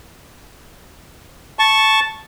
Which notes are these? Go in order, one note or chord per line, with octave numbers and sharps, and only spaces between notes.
A5 C#6